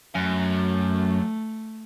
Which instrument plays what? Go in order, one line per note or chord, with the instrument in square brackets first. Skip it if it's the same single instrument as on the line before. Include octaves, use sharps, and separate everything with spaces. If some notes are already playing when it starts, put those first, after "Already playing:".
[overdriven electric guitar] F#2 [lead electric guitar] F#3 G#5 [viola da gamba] A3